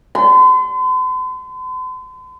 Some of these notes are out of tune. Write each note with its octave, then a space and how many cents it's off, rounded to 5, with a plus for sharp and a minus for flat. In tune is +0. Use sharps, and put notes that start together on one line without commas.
C6 -45